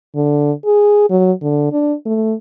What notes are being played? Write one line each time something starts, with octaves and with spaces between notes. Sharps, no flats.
D3
G#4
F#3
D3
D4
A3